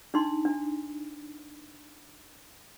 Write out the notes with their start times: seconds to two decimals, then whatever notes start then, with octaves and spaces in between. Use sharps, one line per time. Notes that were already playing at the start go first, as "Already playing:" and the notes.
0.14 D4 D#4 C6
0.45 D4